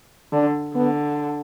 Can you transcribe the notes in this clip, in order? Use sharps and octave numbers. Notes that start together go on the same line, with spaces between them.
D3 D4
D3 B3